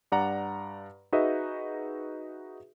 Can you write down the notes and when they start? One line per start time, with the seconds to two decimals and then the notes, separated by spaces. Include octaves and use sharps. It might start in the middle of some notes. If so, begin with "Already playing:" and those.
0.12 G2 D5 F#5 A#5
1.12 D#4 F#4 G#4 B4 D#5 E5